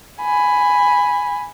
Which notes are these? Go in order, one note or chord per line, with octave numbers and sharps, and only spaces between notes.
G#5 B5